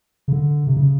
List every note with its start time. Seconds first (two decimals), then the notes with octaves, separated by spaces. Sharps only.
0.28 C#3
0.33 D3
0.67 C3
0.77 C#3